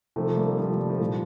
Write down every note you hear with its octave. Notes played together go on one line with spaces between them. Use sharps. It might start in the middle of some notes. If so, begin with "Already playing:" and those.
C3 D#3 F3 A3
G3 A#3
C3 D#3 F3 A3
G3
G3
F3 A3
A#2 F3 G3